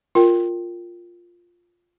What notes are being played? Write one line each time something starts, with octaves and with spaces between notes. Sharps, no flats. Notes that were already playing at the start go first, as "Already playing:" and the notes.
F4 A#4 G5